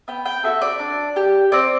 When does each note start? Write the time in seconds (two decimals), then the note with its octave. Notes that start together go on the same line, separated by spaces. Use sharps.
0.08 B3 G5
0.25 G5
0.43 F#4 A4 E5
0.62 D5
0.79 D4
1.16 G4
1.52 C4 D5